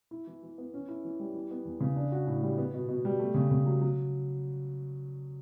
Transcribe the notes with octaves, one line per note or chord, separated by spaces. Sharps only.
E4
E3
E3
B3
C#4
E4
E3
G3
E3
B3
E2
C#3
D4
F#4
A2
G3
B3
B2
B2
G3
A3
C#3
C#3
F#3
F#3